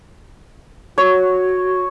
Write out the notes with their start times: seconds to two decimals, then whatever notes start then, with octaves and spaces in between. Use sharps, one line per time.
0.98 F#4 C#5